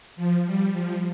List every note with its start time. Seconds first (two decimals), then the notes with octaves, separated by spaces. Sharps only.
0.16 F3
0.45 G3
0.73 F3